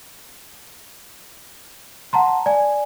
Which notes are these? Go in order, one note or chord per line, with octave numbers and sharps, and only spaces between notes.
F#5 A5 A#5 C6
D5 G#5